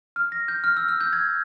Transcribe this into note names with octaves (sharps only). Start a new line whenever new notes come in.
F6
A#6
G6
F6
E6
F6
G6
G#6